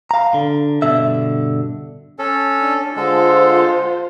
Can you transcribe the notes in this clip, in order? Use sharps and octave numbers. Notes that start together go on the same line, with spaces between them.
F5 A#5
D3
G2 B2 D3 E5
C#4 A4
D4
D3 G#3 F4 A4 C5